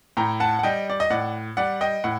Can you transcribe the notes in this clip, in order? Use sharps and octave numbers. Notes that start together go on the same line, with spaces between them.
A2 G5 A#5
F#5 A5
F#5
G3 D#5 G5
D5
D#5
A2 D5 F#5
G3 D5 F#5
D#5 G5
A2 F#5